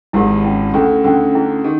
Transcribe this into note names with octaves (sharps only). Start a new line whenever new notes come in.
G#1 G#2 E4 G4 A#4
C#4 E4 G#4
D2 D3 C#4 E4 G#4
D2 D3 C#4 E4 G#4
C#4 E4 G#4
D#3 G#4